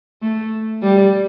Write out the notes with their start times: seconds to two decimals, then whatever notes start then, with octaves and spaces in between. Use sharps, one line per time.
0.22 A3
0.83 G3